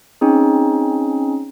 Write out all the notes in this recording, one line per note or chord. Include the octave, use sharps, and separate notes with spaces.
C4 C#4 D#4 G#4